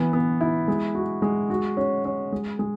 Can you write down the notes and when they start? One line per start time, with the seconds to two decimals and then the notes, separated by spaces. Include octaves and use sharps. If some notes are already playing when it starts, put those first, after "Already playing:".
Already playing: E3 B3
0.13 B3
0.41 E4
0.68 G#3
0.95 F#4
1.22 G#3
1.50 F#4
1.77 C#4
2.05 C#4
2.32 G#3
2.59 G#3